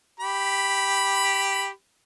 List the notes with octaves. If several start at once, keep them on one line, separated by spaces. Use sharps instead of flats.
G4 B5